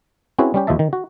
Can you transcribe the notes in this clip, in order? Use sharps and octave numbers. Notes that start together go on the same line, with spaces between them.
C4 C#4 E4 F#4 G#4 B4
G3 C#4 G4
D#2 F3 D#5 E5 A5
D#3
F#4